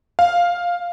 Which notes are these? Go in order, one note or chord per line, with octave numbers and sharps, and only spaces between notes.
F5